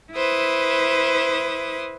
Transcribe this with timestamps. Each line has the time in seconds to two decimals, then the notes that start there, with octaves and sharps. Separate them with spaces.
0.14 E4 B4 C5 D#6